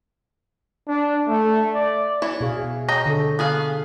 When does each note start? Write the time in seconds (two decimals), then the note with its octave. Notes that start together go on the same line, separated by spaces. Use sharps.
0.88 D4
1.28 A3
1.74 D5
2.22 E3 E4 C#5
2.41 B2 G#4 F5
2.89 C#5 D#5 G5 A#5
3.06 D3 A4
3.39 B3 G#4 F5